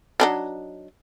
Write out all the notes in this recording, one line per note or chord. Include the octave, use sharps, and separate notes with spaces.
F#3 D4 D#4